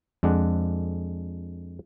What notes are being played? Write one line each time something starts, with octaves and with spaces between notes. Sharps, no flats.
F2 G#3 D4 F#5